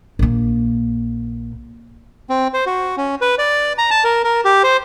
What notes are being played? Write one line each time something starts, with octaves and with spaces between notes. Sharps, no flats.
A#1 A#3
C4
C5
F#4
C#4
B4
D5
A#5
A5
A#4
A#4
G4
C5